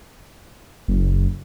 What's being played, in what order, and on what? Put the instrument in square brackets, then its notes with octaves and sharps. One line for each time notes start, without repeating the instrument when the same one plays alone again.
[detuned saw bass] F#1